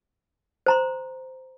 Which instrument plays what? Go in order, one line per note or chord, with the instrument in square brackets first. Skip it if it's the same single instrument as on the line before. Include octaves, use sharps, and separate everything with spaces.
[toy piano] C5 A#5 C6